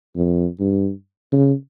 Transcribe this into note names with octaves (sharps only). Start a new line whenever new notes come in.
F2
G2
C#3